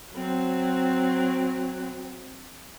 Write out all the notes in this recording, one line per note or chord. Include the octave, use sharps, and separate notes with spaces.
F#3 C4